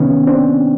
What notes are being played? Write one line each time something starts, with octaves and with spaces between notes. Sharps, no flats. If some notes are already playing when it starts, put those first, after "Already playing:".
Already playing: C3 D#3 B3 C#4
C4 D4